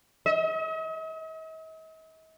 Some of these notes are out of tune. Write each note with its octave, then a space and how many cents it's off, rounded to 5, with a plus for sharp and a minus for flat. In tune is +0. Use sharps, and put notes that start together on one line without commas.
D#5 +45